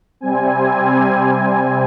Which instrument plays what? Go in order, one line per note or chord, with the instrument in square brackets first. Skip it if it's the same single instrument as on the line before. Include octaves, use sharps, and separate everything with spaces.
[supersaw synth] C3 G3 C4 G#5